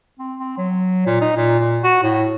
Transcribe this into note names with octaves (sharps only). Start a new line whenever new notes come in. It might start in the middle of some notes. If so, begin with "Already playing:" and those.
C4
C4
F#3
A#2
D#4
A#2
A#2
F#4
A2